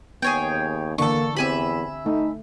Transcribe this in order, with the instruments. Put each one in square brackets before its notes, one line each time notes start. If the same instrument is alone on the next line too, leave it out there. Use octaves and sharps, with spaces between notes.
[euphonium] D#2 [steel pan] B3 [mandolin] G#4 C#5 G5
[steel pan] D3 E3 D4 [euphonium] A#3 [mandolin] A4 C#6
[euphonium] E2 [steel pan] C4 G4 [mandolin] E5 G#5 B5
[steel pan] A3 [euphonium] D#4